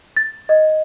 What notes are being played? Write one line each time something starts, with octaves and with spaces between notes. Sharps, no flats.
A6
D#5